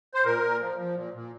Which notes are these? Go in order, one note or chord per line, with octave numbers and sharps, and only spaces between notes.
C5
A#2 A#4
A#2
F3
F3
A#2
A#2